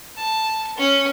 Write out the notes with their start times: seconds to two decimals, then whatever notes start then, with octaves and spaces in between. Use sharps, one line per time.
0.17 A5
0.77 C#4